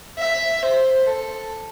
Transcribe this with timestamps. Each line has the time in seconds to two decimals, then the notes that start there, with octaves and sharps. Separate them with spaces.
0.19 E5
0.62 C5
1.06 A4